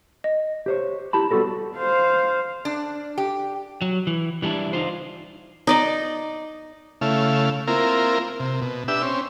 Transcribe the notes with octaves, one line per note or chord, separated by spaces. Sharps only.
D#5
G4 C5 C#5
E4 G4 A5 B5
G3 B3 F#4 A4 A#4
C5 F5
D4
G4
F#3
E3
E3 G3 A3 D4 E4
D#4 F4 C5
D#4 D5 D#5
C#3 A3 E4 F5
A#3 C4 E4 F4 A#4
C3
B2
D4 G4 B4 E5 E6
C4 C#4